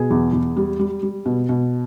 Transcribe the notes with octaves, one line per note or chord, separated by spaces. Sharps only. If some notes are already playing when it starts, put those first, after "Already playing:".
Already playing: B2 G#4
E2
E2
G3
G3
G3
B2
B2